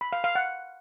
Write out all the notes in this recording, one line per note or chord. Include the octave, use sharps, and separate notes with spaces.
B5
F5
F5
F#5